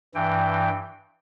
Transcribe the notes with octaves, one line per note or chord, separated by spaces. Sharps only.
G2 E3 G5